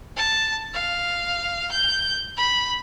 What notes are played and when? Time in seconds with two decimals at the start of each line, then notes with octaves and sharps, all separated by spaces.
0.17 A5
0.74 F5
1.72 G6
2.37 B5